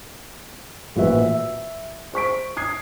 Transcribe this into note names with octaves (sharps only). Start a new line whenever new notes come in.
A1 A#2 F3 F#4 B4 E5
E5
C5 C#6 B6 D7
D#6 G#6 C7